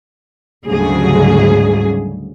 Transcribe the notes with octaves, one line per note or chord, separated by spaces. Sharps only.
D2 G#2 C#3 F#3 G3 G#4